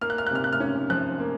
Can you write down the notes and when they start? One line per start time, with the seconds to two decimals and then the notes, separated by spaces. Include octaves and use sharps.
0.01 A#3 F6
0.10 F#6
0.18 F6
0.27 F#6
0.31 C3 F6
0.44 F#6
0.53 F6
0.60 C#4
0.90 F3 F#6
1.20 A#3